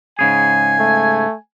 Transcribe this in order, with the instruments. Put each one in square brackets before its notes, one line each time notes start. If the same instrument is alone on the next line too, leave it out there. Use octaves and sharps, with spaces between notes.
[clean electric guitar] G#2 C#3 G#4 [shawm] G#5
[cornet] A3